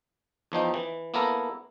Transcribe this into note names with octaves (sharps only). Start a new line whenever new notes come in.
E2 F3 D#4 G5
E3
A#3 B3 E4 A4 A#4 A#5